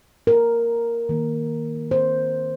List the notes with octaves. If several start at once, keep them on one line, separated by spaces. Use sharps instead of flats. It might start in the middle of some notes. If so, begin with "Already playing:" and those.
A#4
D#3 A#3
C5